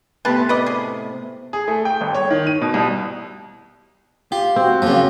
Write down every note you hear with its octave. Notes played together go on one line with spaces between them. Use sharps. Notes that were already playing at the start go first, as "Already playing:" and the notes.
A2 C3 B3 C4 B4 A5
B4 D5 D#5
G#4
G#4
A3
G5
G1
C#5
D#3
D#7
B2
C2
F4 G4
C4 F#4
F#2 C#3 F3 A#3